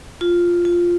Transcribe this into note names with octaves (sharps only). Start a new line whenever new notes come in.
F4
F4